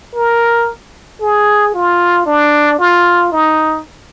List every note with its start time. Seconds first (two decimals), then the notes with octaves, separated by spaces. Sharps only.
0.15 A#4
1.21 G#4
1.74 F4
2.26 D4
2.79 F4
3.32 D#4